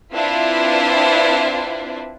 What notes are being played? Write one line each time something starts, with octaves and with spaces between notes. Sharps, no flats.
C4 D4 E4 F4 B4